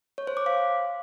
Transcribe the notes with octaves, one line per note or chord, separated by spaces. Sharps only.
C#5
C5
D6
F5